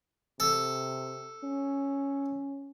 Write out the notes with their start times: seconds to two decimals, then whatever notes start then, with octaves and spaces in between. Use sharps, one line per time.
0.40 C3 A4
1.44 C#4